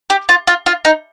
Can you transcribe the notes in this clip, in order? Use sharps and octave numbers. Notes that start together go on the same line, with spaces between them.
G4
F4
F4
F4
D#4